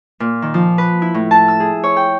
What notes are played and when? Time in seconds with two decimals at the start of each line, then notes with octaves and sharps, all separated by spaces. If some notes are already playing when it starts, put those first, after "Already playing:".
0.20 A#2
0.42 D#3
0.54 F3
0.78 B4
1.02 E4
1.14 A2
1.31 A5
1.48 E6
1.60 G#4
1.83 C#5
1.96 G5